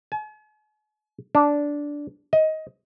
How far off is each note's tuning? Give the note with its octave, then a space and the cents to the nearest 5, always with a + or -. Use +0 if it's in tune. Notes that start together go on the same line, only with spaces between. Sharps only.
G#5 +45
D4 -10
D#5 +15